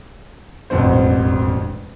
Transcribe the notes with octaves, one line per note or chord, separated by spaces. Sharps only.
E1 A1 F2 D3 C4 C5